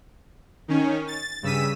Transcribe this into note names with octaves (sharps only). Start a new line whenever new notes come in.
D#3 C#4
A6
G2 C#3 E6 B6 D#7